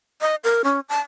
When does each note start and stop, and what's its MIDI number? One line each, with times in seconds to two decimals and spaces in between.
0.21 0.35 75
0.44 0.62 70
0.64 0.80 61
0.89 0.99 81